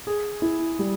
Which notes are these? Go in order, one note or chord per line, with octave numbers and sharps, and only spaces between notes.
G#4
E4
G3